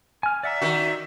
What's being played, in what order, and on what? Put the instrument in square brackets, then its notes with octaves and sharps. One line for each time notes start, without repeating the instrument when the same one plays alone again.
[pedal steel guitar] G#5 F6
[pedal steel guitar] D5 F#5 A#5 [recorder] E5
[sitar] D#3 F#4